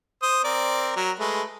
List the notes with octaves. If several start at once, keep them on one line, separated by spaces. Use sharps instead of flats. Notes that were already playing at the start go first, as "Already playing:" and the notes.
C5 D#6
C4 A#4 D5
F#3 A#4
G#3 A3 B4